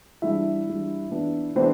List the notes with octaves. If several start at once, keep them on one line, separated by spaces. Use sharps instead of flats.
E3 G3 D4 E4 E5
E3 G3 D4
E3 B3 D4
E3 B3 C4 D4 C5